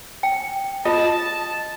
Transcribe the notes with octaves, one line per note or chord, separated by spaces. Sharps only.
G5
F4 D#5 A5